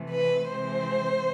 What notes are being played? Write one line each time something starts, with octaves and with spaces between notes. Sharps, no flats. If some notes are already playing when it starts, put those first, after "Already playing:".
Already playing: C3 E3 A3
B4
C3 E3 G#3 C4 C5